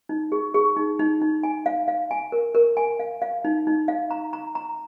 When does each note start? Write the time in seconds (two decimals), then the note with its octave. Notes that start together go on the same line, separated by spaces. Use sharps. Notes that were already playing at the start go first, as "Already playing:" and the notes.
0.09 D#4
0.32 G#4
0.54 G#4
0.77 D#4
0.99 D#4
1.21 D#4
1.43 G#5
1.66 F5
1.88 F5
2.11 G#5
2.32 A#4
2.55 A#4
2.77 G#5
2.99 F5
3.22 F5
3.45 D#4
3.67 D#4
3.88 F5
4.11 A#5
4.33 A#5
4.55 A#5